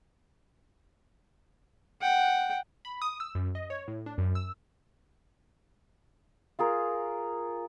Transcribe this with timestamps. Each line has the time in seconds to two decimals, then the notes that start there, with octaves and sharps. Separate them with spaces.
2.01 F#5 G5
2.85 B5
3.02 D#6
3.20 E6
3.35 F#2
3.55 D#5
3.70 C#5
3.88 A2
4.06 D4
4.18 F#2
4.35 E6
6.59 F4 G#4 A#4